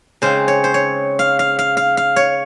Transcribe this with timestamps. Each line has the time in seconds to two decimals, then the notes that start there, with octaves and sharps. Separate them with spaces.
0.22 C#3 G#3 C4 C5
0.48 C#5
0.64 C5
0.74 C#5
1.19 F5
1.39 F5
1.59 F5
1.77 F5
1.97 F5
2.16 C#5